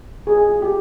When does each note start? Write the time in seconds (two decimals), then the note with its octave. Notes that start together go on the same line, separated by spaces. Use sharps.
0.27 G#4
0.38 G#4
0.49 F4
0.62 G4